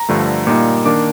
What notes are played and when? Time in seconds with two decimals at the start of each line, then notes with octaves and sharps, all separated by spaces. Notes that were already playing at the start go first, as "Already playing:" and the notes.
Already playing: A#5
0.09 G2 D3 F3 A3
0.47 A#2 G3 A#3 D#4
0.85 D#3 A#3 D4 D6